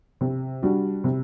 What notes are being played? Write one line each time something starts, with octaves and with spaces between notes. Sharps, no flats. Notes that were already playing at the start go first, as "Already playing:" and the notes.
C3
G3 D4 F#4
C3